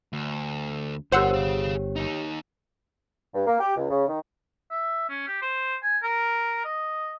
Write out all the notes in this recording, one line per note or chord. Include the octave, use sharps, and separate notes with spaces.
D2
G1 F4 G4 A#4 C5 C#5 F#5 E6
G#4 F5
D#2 D#4
G2
A#3
G4
C#2
C#3
D#3
E5
C#4
G4
C5
G#5
A#4
D#5